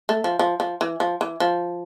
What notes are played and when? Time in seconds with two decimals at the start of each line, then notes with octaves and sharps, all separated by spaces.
0.09 A3
0.24 F3
0.39 F3
0.60 F3
0.81 E3
1.00 F3
1.21 E3
1.40 F3